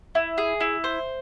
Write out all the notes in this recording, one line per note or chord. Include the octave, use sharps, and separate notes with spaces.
E4
G#4
E4
C5